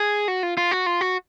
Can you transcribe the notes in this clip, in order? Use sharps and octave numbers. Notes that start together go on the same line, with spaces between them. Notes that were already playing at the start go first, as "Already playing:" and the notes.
Already playing: G#4
F#4
F4
F4
F#4
F4
F#4